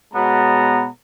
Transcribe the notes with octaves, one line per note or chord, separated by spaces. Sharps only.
B2 G#3 B3 C#5 A5 A#5